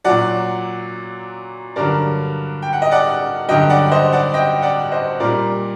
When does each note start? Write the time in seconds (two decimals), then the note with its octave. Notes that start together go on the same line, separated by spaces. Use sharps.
0.04 A#2 F#3 D5 F#5
1.76 G2 D3 F#3 A#4 D5
2.62 G5
2.73 F#5
2.82 D#5
2.91 D5 F#5
3.48 G2 D3 F#3 D#5 G5
3.70 D5 F#5
3.91 C5 D#5
4.13 D5 F#5
4.34 D#5 G5
4.62 D5 F#5
4.91 C5 D#5
5.20 A#2 G3 A#4 D5